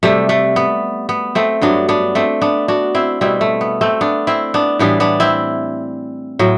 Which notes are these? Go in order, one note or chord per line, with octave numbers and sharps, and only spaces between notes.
C3 G3 A3
A3
B3
B3
A3 C4
G2 F#3 B3 D4
B3 D4
A3 C4
B3 D4
D4 F#4
C4 E4
B2 G3 C4 E4
A3
B3
A3 C4
B3 D4
C4 E4
B3 D4
A2 E3 G3 B3 D4
B3 D4
C4 E4
A2 F#3